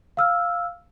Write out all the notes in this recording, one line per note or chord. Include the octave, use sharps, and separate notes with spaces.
F5 E6 F6